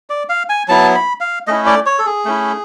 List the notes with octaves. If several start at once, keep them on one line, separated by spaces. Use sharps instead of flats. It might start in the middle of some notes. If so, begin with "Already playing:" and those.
D5
F5
G#5
F#3 B3 E4 A5
B5
F5
A3 C#4 E4 D#5
D5
C#5
A4
G#4
A3 C#4 E4